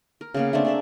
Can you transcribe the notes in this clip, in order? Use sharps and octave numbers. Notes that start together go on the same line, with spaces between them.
A#4
C#3 A#3 B3
A3 A#3 C4 D4
G#4 D5 E5